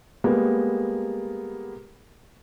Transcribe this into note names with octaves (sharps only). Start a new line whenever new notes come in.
G3 G#3 A#3 B3